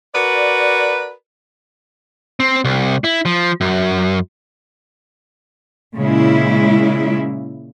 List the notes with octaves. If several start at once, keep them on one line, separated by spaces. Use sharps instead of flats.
F#4 A#4 B4 D5
C4
C2
E4
F3
F#2
A#2 C#3 G#3 E4